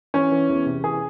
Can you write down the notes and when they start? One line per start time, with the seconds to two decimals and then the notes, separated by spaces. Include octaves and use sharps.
0.14 E3 C#4
0.32 E3
0.49 E2
0.66 C3
0.84 E3 G#4